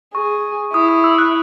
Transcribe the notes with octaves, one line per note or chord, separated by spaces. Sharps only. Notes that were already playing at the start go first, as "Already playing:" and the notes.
G#4 C#6
E4 D#6
D#6
E6
F#6